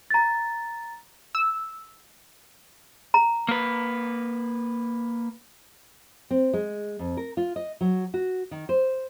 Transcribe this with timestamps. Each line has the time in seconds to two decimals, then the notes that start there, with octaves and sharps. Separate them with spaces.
0.10 A#5 A6
1.35 E6
3.14 A#5
3.48 A#3 B4
6.31 C4
6.53 G#3
6.99 F2
7.17 A#4
7.37 F4
7.56 D#5
7.81 F#3
8.14 F#4
8.51 D#3
8.69 C5